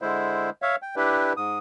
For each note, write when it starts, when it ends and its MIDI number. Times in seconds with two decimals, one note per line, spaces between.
0.02 0.50 50
0.02 0.50 56
0.02 0.50 64
0.02 0.50 72
0.62 0.76 73
0.62 0.76 76
0.62 0.76 77
0.82 0.95 79
0.96 1.33 62
0.96 1.33 64
0.96 1.33 67
0.96 1.33 71
1.37 1.59 44
1.37 1.59 87